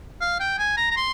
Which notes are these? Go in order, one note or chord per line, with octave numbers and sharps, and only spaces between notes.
F5
G5
G#5
A#5
A#5
C6